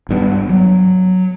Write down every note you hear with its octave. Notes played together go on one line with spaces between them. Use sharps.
G#1 G2 B3
F#3